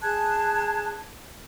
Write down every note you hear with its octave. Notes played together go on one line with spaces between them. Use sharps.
G#4 A5 F#6 G#6